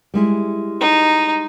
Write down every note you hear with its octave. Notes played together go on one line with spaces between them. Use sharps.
G3 G#3 E4
D#4